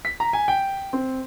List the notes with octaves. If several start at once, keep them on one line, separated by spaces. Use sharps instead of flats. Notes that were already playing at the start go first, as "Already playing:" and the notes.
B6
A#5
G#5
G5
C4